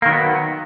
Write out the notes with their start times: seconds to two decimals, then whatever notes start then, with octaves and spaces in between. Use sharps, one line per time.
0.02 A#3
0.06 D#3
0.09 F#3
0.12 B3